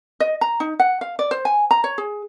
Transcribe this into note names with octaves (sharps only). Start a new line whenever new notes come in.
D#5
A#5
D#4
F#5
F5
D5
C5
G#5
A#5
C#5
G#4